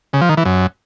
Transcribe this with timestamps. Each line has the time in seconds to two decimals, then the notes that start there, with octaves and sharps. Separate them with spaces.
0.13 C#3
0.21 F3
0.29 D#3
0.37 E3
0.45 F#2